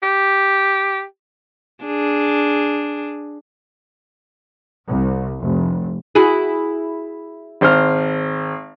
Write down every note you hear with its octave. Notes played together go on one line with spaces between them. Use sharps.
G4
D4 G#4
C2
F1
E4 F#4 G#4
G#1 C5 F6